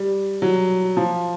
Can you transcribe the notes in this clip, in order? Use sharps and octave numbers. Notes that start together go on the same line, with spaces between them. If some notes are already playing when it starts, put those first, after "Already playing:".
Already playing: G3
F#3
F3